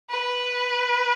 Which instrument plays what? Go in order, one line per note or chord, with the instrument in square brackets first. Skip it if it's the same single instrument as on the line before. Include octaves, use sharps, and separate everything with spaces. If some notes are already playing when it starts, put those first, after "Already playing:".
[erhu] B4